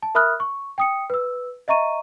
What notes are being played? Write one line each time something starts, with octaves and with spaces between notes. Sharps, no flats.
A5
A#4 E5 B5 D#6 F6 F#6
C#6
G5 D#6 C#7
B4 E6
D#5 E5 A#5 C#6 D#7